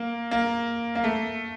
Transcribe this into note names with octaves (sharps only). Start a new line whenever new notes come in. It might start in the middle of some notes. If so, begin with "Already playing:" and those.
Already playing: A#3
A#3
A#3
A3